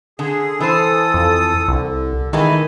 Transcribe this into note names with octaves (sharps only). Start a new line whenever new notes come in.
D3 G#4
E3 A4 C5 D#6
F2
C2 D3
D#3 E3 G#3 A3 G#5